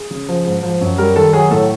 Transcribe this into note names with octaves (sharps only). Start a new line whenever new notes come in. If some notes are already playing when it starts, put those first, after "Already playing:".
Already playing: G#4
C#3
F3
G#2
F3
F#2
G3 A#4
D#3 A4
F#3 G#4
A2 A4